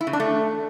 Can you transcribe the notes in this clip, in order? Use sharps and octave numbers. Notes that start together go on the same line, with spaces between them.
E4
C#3
D4
A3